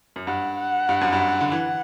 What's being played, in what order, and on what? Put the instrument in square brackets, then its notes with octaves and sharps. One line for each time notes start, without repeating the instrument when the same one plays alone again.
[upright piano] F#2
[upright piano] G2 [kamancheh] F#5
[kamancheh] F#5
[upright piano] G2
F#2
G2
D3
[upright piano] E3 [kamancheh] F#5